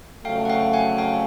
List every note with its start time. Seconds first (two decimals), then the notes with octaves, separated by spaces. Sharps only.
0.24 F2 C#3 F#3 A3 F5 G5
0.45 F#5
0.50 F5 G5
0.73 F#5 G#5
0.98 F5 G5